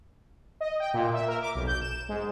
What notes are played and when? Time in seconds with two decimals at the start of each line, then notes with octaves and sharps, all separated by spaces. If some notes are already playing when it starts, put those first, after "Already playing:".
0.61 D#5
0.80 G5
0.94 A#2
1.14 E5
1.28 A#4
1.42 D6
1.55 B1
1.67 G6
1.81 E7
2.09 G#2